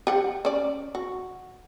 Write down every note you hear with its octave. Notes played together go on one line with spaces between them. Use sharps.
G4 F#5 G5
C#4 D5
F#4